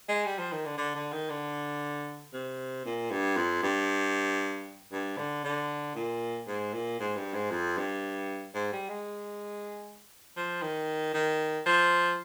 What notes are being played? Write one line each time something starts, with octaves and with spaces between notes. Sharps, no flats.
G#3
G3
F3
D#3
D3
D3
D3
D#3
D3
C3
A#2
G2
F2
G2
G2
D3
D3
A#2
G#2
A#2
G#2
G2
G#2
F2
G2
G#2
G3
G#3
F3
D#3
D#3
F3